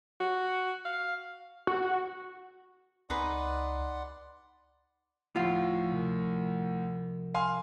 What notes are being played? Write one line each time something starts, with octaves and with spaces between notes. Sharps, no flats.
F#4
F5
F#4
C#2 D#4 G#4 B4 D5 F#5 C6
D2 A2 F3 F4 F5
C2 C3
F5 G#5 C6